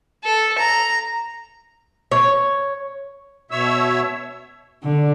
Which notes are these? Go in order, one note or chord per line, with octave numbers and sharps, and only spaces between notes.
A4
A#5
C#5
B2 C#5 E5 E6
D3